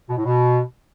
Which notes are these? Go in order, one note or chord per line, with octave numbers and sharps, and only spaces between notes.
B2
A2
B2